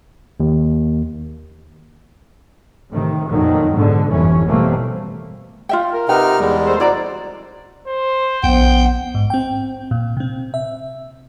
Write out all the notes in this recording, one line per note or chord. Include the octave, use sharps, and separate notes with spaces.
D#2
A2 C3 D#3
F2 A#2 D#3 F#3
G#2 B2 D3
G1 F2 E3 C#4
B2 E3 G3 A3 A#3 C4
F4 E5 G5
A#4
C3 D#4 B4 F#5 G5 F6
E2 G3 G#3
A3 A4 C5
F2 C#3 E4 F#4 D5 A#5
C5
A#1 B3 G5
G#2
C4 G5
A#2
C3 C4
E5